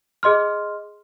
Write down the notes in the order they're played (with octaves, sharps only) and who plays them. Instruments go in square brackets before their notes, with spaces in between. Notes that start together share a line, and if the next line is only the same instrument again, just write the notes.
[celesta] G#4 D#5 C6 F6